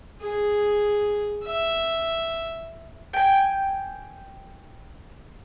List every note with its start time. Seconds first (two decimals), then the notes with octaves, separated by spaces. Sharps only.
0.21 G#4
1.45 E5
3.13 G5 G#5